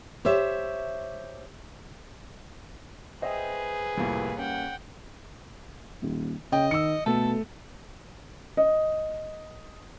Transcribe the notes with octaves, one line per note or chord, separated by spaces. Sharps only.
G4 C5 C#5 E5
G#4 B4 C5 D#5 E5 G5
C2 F2 A2 G3 A#3
C#4 F#5 G5
D#1
C#3 D#5 G5
D#3 E6 C#7
B2 A3 A4
D#5